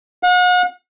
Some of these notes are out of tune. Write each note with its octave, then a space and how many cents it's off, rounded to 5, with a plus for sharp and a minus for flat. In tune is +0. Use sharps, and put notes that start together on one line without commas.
F#5 -40